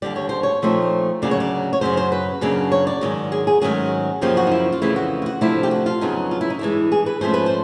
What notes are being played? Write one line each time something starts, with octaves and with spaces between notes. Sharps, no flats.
D#2 D3 G3 D5
C#5
C5
C#5
A#2 F3 A3 C4 D#4
D2 C#3 F#3 A#3 D5
C#5
D5
C#5
F#2 C#3 F#3 C5
C5
B4
F#2 C#3 F#3 A#3 D4
C#5
D5
G#2 D#3 F#3
G#4
G#4
G#2 D#3 F#3 A3 C#4 G#4
F#2 C#3 F3 A#3 D#4 G4
F#4
D#4
E4
F4
F2 C#3 E3 A3 E4
F#4
F4
F#4
C3 F3 A3 D4 E4
G4
F#4
F4
F2 C#3 F#3 B3 D#4
F4
E4
D#4
G2 E3 G#3 E4
G#4
B4
G#2 F3 A3 C#4 C5
B4
C5